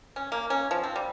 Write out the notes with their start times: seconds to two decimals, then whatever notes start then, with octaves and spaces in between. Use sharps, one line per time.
0.16 C#4
0.32 A#3
0.50 C#4
0.71 F3
0.83 C4
0.96 G3